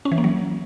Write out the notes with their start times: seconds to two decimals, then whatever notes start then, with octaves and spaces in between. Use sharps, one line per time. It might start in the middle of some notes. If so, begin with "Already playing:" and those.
0.05 C#4
0.12 E3
0.18 A#3
0.24 F#3